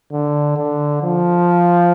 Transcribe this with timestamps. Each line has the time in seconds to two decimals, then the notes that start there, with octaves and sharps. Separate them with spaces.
0.12 D3
0.57 D3
1.03 F3